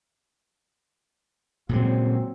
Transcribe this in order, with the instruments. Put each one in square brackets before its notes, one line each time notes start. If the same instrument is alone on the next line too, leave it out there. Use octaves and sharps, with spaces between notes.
[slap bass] A#2 C#3 G#3 [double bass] F#3 C4